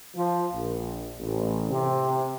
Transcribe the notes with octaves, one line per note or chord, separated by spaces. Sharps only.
F3
A#1
A1
C3